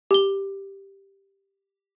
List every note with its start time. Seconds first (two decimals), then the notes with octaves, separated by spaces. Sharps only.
0.11 G4 G7